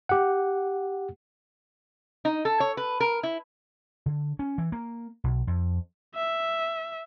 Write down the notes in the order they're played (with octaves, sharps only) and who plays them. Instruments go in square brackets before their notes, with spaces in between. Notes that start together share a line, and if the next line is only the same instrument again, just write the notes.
[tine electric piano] G4 F#5
[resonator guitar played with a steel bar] D#4
A4
C#5
B4
A#4
E4
[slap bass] D3
C#4
E3
A#3
B1
F2
[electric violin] E5